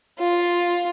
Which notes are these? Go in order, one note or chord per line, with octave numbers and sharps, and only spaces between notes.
F4